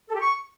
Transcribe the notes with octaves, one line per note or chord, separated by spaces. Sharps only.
A4
G4
C#6